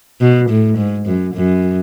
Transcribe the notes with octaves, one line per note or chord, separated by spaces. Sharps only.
B2
A2
G#2
F#2
F#2